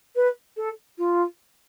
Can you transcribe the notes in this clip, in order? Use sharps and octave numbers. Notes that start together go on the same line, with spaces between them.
B4
A4
F4